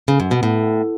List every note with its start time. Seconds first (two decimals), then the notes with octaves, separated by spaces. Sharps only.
0.08 C#3
0.20 F#2
0.31 B2
0.43 A2